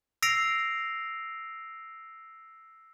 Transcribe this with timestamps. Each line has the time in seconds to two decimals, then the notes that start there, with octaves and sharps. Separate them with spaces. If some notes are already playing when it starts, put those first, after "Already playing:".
0.22 E6 A#6 C7 D7 F7